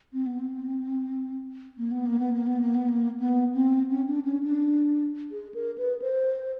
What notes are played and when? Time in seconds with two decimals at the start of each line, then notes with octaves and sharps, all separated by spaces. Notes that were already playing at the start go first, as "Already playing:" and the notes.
0.13 C4
0.26 B3
0.40 C4
1.78 A#3
1.91 B3
2.06 A#3
2.19 B3
2.33 A#3
2.47 B3
2.61 A#3
2.75 B3
2.89 A#3
3.20 B3
3.54 C4
3.90 C#4
4.07 D4
4.25 C#4
4.43 D4
5.31 G#4
5.54 A#4
5.78 B4
6.02 C5